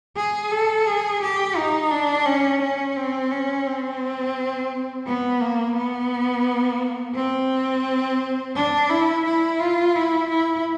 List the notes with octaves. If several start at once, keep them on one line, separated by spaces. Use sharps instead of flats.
G#4
A4
G#4
G4
D#4
D4
C#4
C#4
C4
C#4
C4
B3
A#3
B3
C4
D4
E4
E4
F4
E4
E4